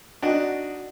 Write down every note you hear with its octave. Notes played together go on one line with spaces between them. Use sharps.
D4 D#4 F#4